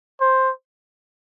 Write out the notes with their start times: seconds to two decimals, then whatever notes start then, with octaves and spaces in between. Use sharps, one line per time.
0.21 C5